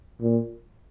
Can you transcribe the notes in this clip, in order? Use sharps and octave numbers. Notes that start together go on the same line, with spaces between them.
A#2